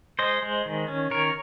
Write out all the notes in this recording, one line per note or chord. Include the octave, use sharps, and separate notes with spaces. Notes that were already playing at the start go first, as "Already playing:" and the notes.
G#3 C5 D#5
G#3
D#3
C#4
D#3 A#4 C#5